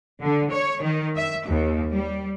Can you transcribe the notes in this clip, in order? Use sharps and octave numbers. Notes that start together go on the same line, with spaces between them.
D3
C#5
D#3
E5
D#2
G3